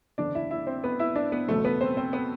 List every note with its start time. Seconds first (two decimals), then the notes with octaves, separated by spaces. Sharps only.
0.18 F#1 E2 D3 D4 D5
0.35 E4 E5
0.51 E4 E5
0.67 C4 C5
0.84 B3 B4
0.99 E4 E5
1.16 D4 D5
1.32 B3 B4
1.48 F#1 E2 B2 F#3 A3 A4
1.65 B3 B4
1.81 C4 C5
1.97 C4 C5
2.13 B3 B4